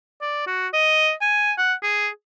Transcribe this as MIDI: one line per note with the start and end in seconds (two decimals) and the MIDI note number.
0.21 0.44 74
0.47 0.67 66
0.73 1.12 75
1.21 1.52 80
1.58 1.74 78
1.83 2.08 68